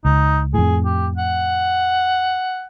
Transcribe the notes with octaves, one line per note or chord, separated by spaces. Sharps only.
C#2 D#4
F2 A2 G#4
G4
F#5